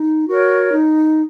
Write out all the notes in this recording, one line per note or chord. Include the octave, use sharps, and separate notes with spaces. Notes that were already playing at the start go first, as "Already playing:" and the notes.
Already playing: D#4
F#4 A#4 C#5
D#4